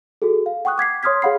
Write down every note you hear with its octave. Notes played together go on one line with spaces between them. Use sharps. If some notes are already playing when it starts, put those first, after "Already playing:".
F#4 G#4 A4
F5
F#5 G5 C#6 D#6 F#6
D6 G#6 B6 C7
C#5 C6 D#6 F6 G#6 B6
G#4 C#5 F5 F#5 B5 C7